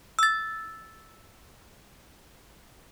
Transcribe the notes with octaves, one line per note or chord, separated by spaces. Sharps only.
E6 A6